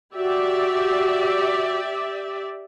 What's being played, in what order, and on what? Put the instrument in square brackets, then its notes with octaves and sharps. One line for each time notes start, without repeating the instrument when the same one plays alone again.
[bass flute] F#4 [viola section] G4 D5 E5